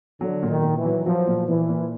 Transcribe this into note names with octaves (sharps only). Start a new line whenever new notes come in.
D3 F#3
A#2
D#3
A#2
E3
F#3
F3 F#3
A#2
A#2 E3
A#2